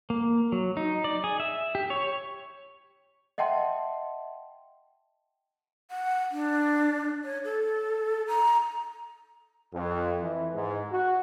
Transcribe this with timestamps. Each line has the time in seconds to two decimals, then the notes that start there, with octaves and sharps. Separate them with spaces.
0.10 A#3
0.52 F#3
0.77 D#4
1.04 D5
1.24 G#4
1.40 E5
1.75 G4
1.90 C#5
3.38 D#5 E5 F#5 G5 A5 C6
5.91 F#5
6.31 D4
7.24 C#5
7.44 A4
8.28 A#5
9.74 F2
10.21 E3
10.54 G#2
10.92 F#4